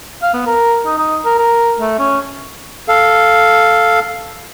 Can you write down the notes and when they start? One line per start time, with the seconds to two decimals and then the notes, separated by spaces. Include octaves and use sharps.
0.22 F5
0.34 B3
0.46 A#4
0.86 D#4
0.98 D#4
1.25 A#4
1.38 A#4
1.79 A3
1.99 C#4
2.88 A4 F5